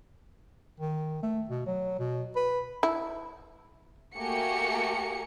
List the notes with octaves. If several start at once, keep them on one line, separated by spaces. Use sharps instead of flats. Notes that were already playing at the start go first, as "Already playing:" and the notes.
D#3
A3
B2
F#3
B2
B4
E4
A3 A#3 F#4 G4 G#5 C#7